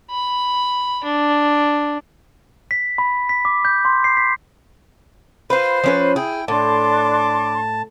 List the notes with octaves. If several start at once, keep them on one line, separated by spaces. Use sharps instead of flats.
B5
D4
B6
B5
B6
D6
G6
C6
C7
B6
F4 B4 C5
F3 C#4 B4
E4 G#4 G5
A2 D4 A5 C6 D6